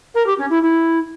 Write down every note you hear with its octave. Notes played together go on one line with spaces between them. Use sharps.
A#4
G4
C#4
E4
E4